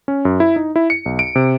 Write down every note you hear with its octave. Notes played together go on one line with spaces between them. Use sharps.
C#4
F#2
E4
D#4
E4
C#7
B1
D7
C3